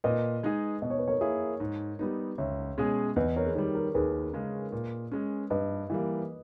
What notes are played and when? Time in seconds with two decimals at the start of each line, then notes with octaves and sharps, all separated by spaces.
0.04 A#2 B4 D#5
0.43 G#3 D#4 G#4
0.82 B2 D#5
0.90 C#5
0.99 B4
1.07 A#4 C#5
1.21 A#3 E4 G#4
1.60 G#2
1.99 G3 B3 D#4
2.38 C#2 C#5 E5
2.78 B2 G#3 C#4 G#4
3.16 E2 B4 D#5
3.36 A#4 C#5
3.46 G#4
3.55 D#3 G3 A#4
3.75 A#4
3.94 D#2 G#4 B4
4.33 C#3 G#3 C#4
4.72 A#2
5.12 G#3 C#4
5.50 G2 B4 D#5
5.90 E3 G3 A#3